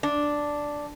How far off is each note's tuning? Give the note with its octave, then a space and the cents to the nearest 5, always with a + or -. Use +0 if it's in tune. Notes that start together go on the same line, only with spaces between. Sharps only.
D4 +0